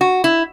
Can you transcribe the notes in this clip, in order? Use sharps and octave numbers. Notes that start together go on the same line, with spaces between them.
F#4
E4